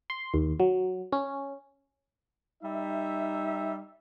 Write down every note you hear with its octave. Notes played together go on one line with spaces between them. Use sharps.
C6
D#2
F#3
C#4
G3 D#4 E5